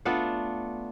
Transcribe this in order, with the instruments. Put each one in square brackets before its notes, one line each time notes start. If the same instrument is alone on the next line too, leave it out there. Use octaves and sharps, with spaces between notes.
[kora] A3 B3 D4 F4